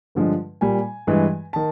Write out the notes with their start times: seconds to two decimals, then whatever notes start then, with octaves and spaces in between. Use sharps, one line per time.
0.15 G2 D3 F3 G#3
0.61 A#2 G3 G#5
1.07 G2 E3 G#3
1.53 D#3 A5